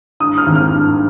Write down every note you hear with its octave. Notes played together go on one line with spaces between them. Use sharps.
G2 D#6
F6
G#1
F6
G2